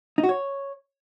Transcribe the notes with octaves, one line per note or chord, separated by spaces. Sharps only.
D#4
F#4
C#5